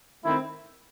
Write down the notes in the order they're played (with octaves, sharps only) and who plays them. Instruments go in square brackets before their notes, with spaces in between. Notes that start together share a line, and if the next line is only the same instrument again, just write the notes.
[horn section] D#3 A3 C4 [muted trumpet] E4